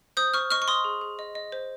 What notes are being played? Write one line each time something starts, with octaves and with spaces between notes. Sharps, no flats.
C5 D#6 G6
C5 C#6 F6
D#5 C#6 F6
C#6
D#5 C6 D#6
G#4
G#4
D#5
D#5
C5